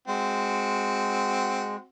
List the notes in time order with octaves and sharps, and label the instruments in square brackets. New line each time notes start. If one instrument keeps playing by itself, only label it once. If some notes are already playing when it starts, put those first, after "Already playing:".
[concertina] G#3 [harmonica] C4 F#4